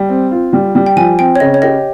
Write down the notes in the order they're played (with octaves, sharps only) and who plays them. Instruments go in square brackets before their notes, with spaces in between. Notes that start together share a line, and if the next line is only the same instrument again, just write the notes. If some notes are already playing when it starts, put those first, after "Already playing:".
Already playing: [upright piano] G3
C4
F4
G3
G3
[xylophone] G5
[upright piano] F3 [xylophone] G#5
[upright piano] C4 [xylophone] G5
[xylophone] C#5
[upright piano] C#3 [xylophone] D#5
[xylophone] C#5
[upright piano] G4 [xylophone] D#5